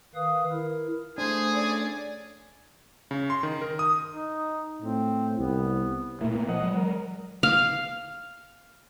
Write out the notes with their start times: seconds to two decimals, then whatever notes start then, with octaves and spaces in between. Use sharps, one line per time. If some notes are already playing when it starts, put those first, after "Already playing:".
0.15 D#3 B4 F5 D#6
0.52 E4 A#4
1.18 A3 D4 G#4 C5
1.54 C#4 D5
3.11 C#3
3.30 C6
3.43 D#3
3.61 A#4
3.79 D#6
4.10 D#4
4.82 A2 C4
5.39 C2 B3
6.21 A#2 A3 A#3 E4
6.34 A#3 B3
6.48 F3 D#5 F#5
6.63 F#3 G#3
6.77 A#4
7.43 F5